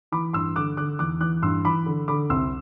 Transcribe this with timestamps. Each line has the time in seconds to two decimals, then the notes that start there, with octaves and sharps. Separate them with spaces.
0.12 E3 B5 D6
0.33 G2 C6 E6
0.56 D3 D6 F#6
0.77 D3 D6 F#6
0.99 E2 D6 F#6
1.20 E3 D6 F#6
1.42 G2 C6 E6
1.65 E3 B5 D6
1.86 D3
2.08 D3 B5 D6
2.30 C2 C6 E6